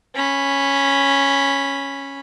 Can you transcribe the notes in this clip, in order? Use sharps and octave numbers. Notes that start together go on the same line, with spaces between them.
C#4 B5